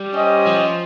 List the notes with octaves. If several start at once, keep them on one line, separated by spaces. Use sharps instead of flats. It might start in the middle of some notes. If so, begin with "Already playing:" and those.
Already playing: G3
C#4 G4 C5 D#5
F3